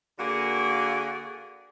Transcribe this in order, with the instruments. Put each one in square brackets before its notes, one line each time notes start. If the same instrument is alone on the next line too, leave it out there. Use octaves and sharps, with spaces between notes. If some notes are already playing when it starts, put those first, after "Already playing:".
[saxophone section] D3 A#3 F#4 G#4